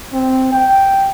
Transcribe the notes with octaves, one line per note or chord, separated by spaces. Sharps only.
C4
G5